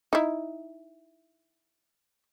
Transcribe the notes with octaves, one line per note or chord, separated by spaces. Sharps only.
D#4 E4